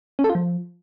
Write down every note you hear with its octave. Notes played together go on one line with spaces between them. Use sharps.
C#4
A4
F4
F3